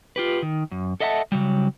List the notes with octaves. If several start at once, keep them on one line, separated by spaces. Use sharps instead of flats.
F4 G4 B4
D#3
F#2
A4 D#5 E5 F#5 G#5 A5
C#3 F#3 G3